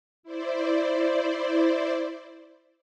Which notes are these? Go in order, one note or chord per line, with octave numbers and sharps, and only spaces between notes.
E4 C5 D5